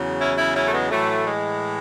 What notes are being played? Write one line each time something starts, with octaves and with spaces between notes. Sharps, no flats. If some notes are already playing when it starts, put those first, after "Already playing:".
Already playing: E2 C#3 F#3
C#4 E4
C#4 E4
C#4 E4
A3
G#3 B3
A2 E3 F#3 A3
G#3